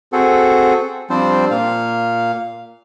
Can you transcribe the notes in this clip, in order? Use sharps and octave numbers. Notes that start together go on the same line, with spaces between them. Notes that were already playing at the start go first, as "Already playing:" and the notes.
C4 F#4 G#4 A4
F3 G3 C4 D4 C5
A#2 F5